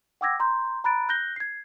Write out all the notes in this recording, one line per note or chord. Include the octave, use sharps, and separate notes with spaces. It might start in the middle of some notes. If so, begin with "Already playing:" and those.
F#5 G5 D6 E6 G#6 A#6
A#5 C6 G6
A#5 B5 F#6 A6 D7
F#6 G6 A#6 G7
G#6 C7